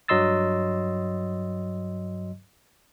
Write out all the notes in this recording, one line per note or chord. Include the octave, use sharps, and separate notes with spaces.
G2 F#3 D#5 C6 E6 A6